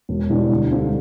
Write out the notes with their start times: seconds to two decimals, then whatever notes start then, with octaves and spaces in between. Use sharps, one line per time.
0.09 E1
0.30 E2 B2 G3 D4
0.50 D2
0.71 D3 G3 C4 F4